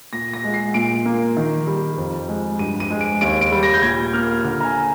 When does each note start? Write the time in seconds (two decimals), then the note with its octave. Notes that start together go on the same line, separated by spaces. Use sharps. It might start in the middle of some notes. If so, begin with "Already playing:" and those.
0.13 A#2 A#6
0.34 A#6
0.44 G#3
0.54 C7
0.74 A#2 D7
1.06 A#3
1.37 D#3
1.67 G3
1.98 F2
2.28 G#3
2.59 G2 D#7
2.80 D#7
2.90 G#3
3.01 D7
3.21 D#2 D7
3.41 D7
3.52 G3
3.63 A#6
3.74 G6
3.82 A#2 G#6
4.13 A#3 F6
4.45 D3 F6
4.60 A#5
4.65 G#5